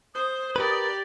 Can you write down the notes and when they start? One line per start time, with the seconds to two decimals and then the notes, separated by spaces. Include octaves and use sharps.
0.15 C5 D#6
0.56 G4 A#4 B4 D5